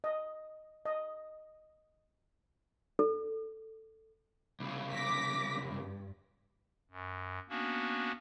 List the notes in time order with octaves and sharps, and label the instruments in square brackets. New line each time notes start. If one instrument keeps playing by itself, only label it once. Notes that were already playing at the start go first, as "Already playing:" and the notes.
[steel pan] D#5
D#5
[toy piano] A4
[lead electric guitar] C2 C#3
[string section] D6 A#6 B6
G2
[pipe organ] F#2
A#3 B3 C#4 D4 F#4